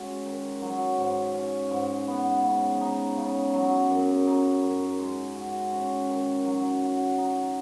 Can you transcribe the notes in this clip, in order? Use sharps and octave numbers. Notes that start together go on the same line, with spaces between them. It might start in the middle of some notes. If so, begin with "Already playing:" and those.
Already playing: G#3 C#4 F#4
D#3
F#3
G#2
C#4
G#2
B3
C#3
D#4
C#3
F#3
F#2
D#4
F#2
G#3
F#4
C#4
D#3
F#3
F#4
D#4